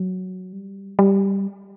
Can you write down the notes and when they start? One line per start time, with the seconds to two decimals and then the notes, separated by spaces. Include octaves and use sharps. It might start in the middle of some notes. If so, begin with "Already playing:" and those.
Already playing: F#3
0.53 G3
0.99 G3